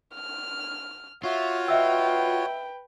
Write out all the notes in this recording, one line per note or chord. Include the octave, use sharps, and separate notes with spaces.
F6
F4 F#4 C#5 E5
B4 D#5 E5 G5 E6